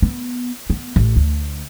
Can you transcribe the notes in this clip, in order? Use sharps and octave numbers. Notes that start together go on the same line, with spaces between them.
B3
B3
A1
D2